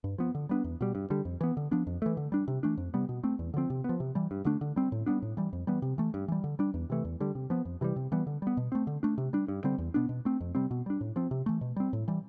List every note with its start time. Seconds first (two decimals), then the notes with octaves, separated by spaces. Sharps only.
0.04 G2
0.18 F3 B3
0.35 D3
0.49 G3 B3 D4
0.64 E2
0.81 B2 G3
0.95 G2
1.10 D3 G3
1.25 F2
1.41 E3 B3
1.57 D3
1.71 F3 B3 D4
1.87 F2
2.02 E3 A3
2.17 D3
2.32 G3 D4
2.48 C3
2.63 E3 A3 D4
2.77 F2
2.94 C3 G3 B3
3.09 B2
3.23 A3 C4
3.39 E2
3.54 D3 F3 C4
3.70 C3
3.84 F3 B3
4.00 C3
4.15 E3 G3
4.31 G2
4.45 D3 A3 D4
4.61 D3
4.76 G3 C4
4.92 A2
5.06 G3 B3 D4
5.22 A2
5.37 E3 G3
5.53 F2
5.67 E3 G3 B3
5.82 C3
5.98 E3 A3
6.14 G2
6.28 E3 G3
6.44 D3
6.59 G3 D4
6.74 E2
6.90 C3 E3 A3
7.05 E2
7.20 D3 G3
7.35 C3
7.50 F3 B3
7.65 F2
7.81 C3 E3 G3
7.96 C3
8.12 E3 G3 B3
8.27 D3
8.42 G3 B3
8.57 B2
8.72 A3 C4
8.87 D3
9.03 A3 D4
9.18 C3
9.33 G3 D4
9.48 G2
9.64 D3 G3 C4
9.78 E2
9.94 B2 B3 D4
10.09 B2
10.25 A3 C4
10.41 F2
10.55 C3 G3 C4
10.71 B2
10.86 G3 D4
11.01 A2
11.16 F3 C4
11.31 C3
11.46 E3 A3
11.61 B2
11.76 G3 C4
11.93 A2
12.08 E3 G3